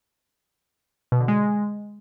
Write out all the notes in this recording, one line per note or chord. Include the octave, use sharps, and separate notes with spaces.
B2
D3
G#3